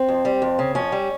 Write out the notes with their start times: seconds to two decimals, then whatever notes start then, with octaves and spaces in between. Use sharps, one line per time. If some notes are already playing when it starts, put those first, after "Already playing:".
Already playing: C4
0.09 F2
0.25 G3
0.42 F2
0.59 C#3
0.75 F2 C#4
0.92 G3